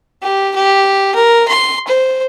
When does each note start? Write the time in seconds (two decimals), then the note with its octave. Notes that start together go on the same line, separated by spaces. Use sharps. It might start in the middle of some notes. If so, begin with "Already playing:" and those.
0.23 G4
0.56 G4
1.15 A#4
1.48 C6
1.87 C5